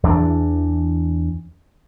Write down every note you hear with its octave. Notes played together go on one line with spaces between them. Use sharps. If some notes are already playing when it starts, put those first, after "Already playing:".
E2 E3 D4